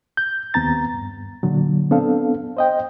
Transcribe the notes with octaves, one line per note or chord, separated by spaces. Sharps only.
G6
D#2 B3 C4 A#5 A6
G2
A#2 D3 F#3
B3 C4 D4 A4 F5
C5 D#5 G5